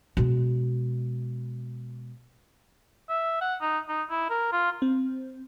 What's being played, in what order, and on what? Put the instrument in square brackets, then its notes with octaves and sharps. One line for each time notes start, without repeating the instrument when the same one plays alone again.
[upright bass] B2 G#3
[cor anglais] E5
F#5
D#4
D#4
E4
A#4
F4
[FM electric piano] C4